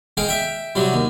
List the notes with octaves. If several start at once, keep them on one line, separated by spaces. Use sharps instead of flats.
G#3 G#4 F5 G5
E5 G5
C3 F#3 G3
D#2